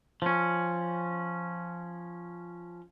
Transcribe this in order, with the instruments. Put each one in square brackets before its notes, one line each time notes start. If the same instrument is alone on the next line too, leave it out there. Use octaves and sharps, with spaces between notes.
[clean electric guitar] F3 C#4